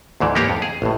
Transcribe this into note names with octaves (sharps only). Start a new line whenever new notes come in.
D2 G#2 E3
A#3 B3 G4 C#5 F5 A#5
F2
G#4
A1 A2